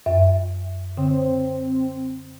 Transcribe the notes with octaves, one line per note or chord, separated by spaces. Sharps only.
F#2 E5
D3 C4